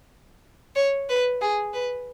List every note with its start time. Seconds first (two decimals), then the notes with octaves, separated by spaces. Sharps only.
0.76 C#5
1.09 B4
1.41 G#4
1.74 B4